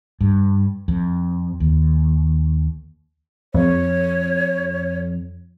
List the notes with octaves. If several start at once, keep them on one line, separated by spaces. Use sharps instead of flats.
G2
F2
D#2
F2 C#5